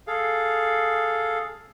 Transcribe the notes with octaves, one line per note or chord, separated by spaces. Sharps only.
G#4 A4 F5